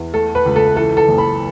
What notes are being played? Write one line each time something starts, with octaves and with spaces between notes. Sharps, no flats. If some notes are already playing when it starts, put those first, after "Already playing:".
Already playing: E2
A3 A4
B4
C#2
A4
E3 A4
A4
F#1
B5